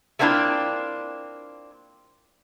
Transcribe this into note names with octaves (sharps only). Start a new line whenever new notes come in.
A3 A#3 C4 D4 E4 F4